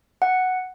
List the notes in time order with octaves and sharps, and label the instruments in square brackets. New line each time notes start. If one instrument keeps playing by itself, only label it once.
[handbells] F#5